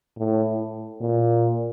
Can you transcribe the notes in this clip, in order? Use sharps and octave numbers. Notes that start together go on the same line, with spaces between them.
A2
A#2